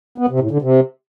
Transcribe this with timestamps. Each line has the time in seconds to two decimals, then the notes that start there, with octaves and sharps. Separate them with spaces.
0.18 B3
0.29 C3
0.40 A2
0.51 D3
0.62 C3